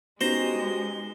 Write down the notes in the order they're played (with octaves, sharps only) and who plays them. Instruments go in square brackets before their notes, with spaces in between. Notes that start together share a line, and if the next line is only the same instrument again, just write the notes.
[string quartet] G#3 [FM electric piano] B3 C#4 D#4 [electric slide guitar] F#4 G4 [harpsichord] C5 A#5